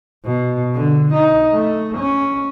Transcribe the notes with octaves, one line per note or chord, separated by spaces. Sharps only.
B2
D3
D#4
A3
C#4